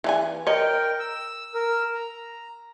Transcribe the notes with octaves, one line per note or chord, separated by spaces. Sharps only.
E3 D#4 G#5
A#4 C#5 D#5 G5
E6
A#4 E6
A#5